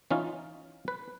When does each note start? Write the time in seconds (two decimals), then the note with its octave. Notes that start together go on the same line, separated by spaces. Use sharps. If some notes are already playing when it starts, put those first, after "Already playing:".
0.11 E3 C#4 D#4 F4
0.88 B4